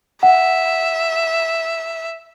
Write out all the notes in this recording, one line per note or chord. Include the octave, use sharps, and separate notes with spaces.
E5 F#5